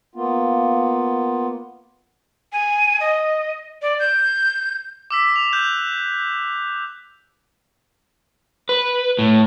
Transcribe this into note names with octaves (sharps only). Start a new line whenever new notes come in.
A#3 B3 F4
G#5
D#5
D5
G6
D6 E6 B6
F7
F#6 G6
B4
A2